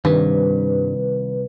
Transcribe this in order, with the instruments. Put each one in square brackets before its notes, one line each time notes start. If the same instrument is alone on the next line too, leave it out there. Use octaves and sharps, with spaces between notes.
[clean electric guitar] C2 [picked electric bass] G2 [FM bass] D#3 [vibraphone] B4